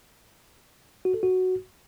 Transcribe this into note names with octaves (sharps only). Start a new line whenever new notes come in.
F#4
A4
F#4